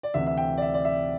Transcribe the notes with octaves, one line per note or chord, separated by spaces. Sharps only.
D5
D2 C3 E3 E5
E5
G5
D5
E5
D5
E5